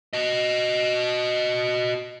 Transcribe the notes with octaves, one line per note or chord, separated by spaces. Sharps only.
F#4 D#5